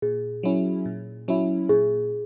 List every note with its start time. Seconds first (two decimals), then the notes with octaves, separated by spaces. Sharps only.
0.02 A#2 G#4
0.43 F#3 C#4 E4
0.86 A#2
1.28 F#3 C#4 E4
1.69 A#2 G#4